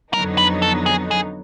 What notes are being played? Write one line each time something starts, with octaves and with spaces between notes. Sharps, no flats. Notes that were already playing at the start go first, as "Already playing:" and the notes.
F2 D3 F#3 B3 D#4 A#4
B4
A4
G#4
G#4